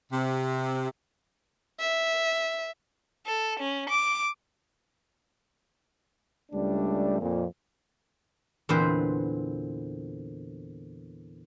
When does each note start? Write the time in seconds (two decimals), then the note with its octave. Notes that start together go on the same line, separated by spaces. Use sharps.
0.11 C3
1.80 E5
3.26 A4
3.60 C#4
3.90 D6
6.51 C#2 G3 A3 D4
7.20 F2 A#2
8.69 E2 A#2 D3 C4 B4 C5